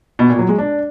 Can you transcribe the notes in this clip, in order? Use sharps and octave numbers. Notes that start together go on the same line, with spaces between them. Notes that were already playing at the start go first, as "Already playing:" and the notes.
B2
A#2
F#3
G#3
D4